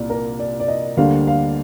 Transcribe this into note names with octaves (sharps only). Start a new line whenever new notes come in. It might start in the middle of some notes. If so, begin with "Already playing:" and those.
Already playing: C2 A#2 A#3 D5
A#4
D5
D5
D#5
D2 D3 G3 A#3 F5
F5